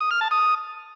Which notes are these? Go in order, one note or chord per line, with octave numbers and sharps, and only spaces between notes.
D#6
F6
A5
D#6